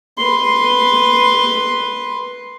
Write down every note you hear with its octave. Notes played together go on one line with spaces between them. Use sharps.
B4 C6